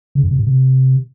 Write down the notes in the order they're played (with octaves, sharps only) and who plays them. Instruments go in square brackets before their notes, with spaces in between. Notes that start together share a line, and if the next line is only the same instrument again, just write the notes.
[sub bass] C#3
F#2
C3
G#2
C3